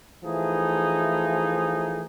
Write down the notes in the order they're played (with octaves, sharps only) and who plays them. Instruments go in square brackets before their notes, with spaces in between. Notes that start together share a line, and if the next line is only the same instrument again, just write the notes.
[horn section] E3 F3 A3 D#4 G#4